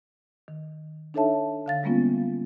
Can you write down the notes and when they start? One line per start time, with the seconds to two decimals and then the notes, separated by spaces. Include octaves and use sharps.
0.48 D#3
1.14 D4 D#4 A4 C#5 E5 A5
1.66 D3 F5 A6
1.83 G3 G#3 A#3 B3 C#4 F4